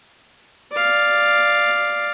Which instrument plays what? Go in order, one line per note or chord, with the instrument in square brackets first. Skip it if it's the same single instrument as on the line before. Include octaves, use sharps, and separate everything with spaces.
[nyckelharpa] D5 F5